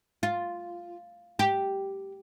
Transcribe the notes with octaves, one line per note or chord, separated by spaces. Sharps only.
F4
G4